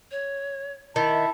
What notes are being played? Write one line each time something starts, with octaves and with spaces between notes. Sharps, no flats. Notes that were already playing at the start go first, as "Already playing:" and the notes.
C#5
D#3 E4 E5 A5